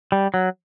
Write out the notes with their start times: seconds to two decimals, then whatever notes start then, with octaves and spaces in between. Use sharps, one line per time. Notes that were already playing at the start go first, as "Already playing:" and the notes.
0.12 G3
0.34 F#3